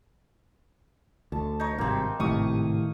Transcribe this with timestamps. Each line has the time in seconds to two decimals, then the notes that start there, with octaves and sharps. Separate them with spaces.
1.32 D2 A5
1.60 D#4 C#5
1.78 G#1 G2 C3 A#3 C4
2.20 G#1 D#2 A2 C3 F5 C#6 D#6